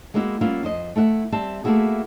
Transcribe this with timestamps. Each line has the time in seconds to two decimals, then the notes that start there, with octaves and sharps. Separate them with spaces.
0.14 G#3 A#3 B3 E4 F#4
0.41 G3 A#3 B3 C#4 E4 F4
0.63 F2 C5 D#5
0.96 A3 E4 E5 F#5
1.32 G3 C4 E5 A5
1.64 A3 A#3 C4 E4 F#4 G#4